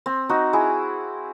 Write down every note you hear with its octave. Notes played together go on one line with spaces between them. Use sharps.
C4
D#4 F#4
E4 G#4